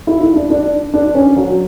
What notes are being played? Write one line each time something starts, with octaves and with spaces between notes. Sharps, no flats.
E4
E4
D4
D4
D4
C#4
F#3